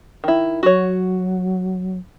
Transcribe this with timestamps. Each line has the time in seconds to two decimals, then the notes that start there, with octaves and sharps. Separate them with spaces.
0.24 D#3 E4
0.63 F#3 F#4 C#5